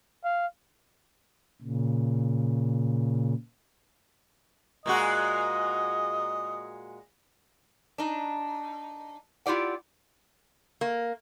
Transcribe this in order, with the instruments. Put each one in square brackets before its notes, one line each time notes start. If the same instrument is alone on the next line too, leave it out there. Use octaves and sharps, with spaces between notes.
[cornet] F5
[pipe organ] A#2 C#3
[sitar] A#2 G#3 F#4 [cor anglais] D#5
[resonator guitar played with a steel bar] D4 D#4
E4 F4 G4 D5 F#5
A#3